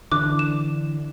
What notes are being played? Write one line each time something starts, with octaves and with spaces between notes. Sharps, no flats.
D3 E3 D4 D6 F#6
E7